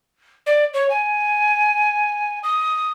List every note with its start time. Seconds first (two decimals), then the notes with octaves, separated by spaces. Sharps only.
0.46 D5
0.74 C#5
0.90 G#5
2.43 D#6